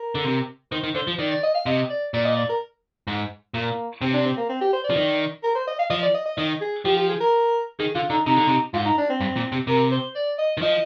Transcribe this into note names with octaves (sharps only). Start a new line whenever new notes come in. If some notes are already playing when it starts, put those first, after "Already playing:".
Already playing: A#4
D3
C3
D#3 C5
D#3
D3 C5
F3
D#3 D5
D5
D#5
F5
C3 D#5
D5
A#2 D5
D#5
D5
A#4
G#2
A#2 A#3
C3 C4
D4
C4
A#3
C4
G4
C5
D5
F3
D#3
A#4
C5
D#5
F5
F3 D#5
D5
D#5
D#5
D#3 D#5
G#4
F3 G4
G4
G#4
A#4
D#3 G#4
D3 F4
D3 D#4
C3 D#4
D3
C3
G#2 F4
D#4
D4
C4
G2
A#2
C3
C3 A#4
C5
D5
D#5
D#3
F3 D#5